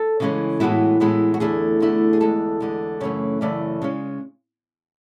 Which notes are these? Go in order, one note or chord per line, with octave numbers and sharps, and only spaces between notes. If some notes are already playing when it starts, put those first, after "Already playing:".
Already playing: A4
C#3 E3 G#3 C#4
A2 E3 G#3 B3 E4 F#4
A2 E3 G#3 B3 E4
F#4
E2 D3 A3 E4 G#4
E2 D3 A3 E4
G#4
E2 D3 G#3 A4
E2 D3 G#3
F#2 C#3 E3 A3 C#4 C#5
F#2 C#3 E3 A3 C#4 D5
C#3 G#3 C#4